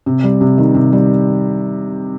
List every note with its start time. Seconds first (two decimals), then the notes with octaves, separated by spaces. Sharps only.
0.06 C3
0.23 G3
0.41 C3
0.58 D#3
0.74 C3
0.92 G3